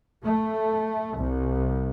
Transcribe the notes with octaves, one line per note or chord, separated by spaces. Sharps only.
A3
C2